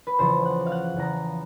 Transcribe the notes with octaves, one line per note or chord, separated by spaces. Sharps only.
B4
E2 C#3 F3 C5
F#5
F5
F#5
E2 C#3 F3 A#5